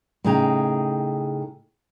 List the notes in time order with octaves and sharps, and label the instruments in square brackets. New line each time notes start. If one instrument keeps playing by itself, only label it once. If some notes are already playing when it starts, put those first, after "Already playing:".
[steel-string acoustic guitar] A2 C#3 D#4 G#4 G5 A#5